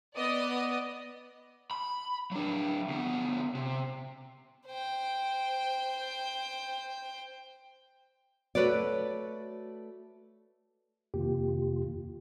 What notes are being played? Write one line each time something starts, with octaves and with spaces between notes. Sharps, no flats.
B3 D5 D#5
B5
F#3 D4
D2 B3
C3
C5 G5
A3 F#4 B4 C#5 D5
F2 C3 D#3 A#3 F4 G4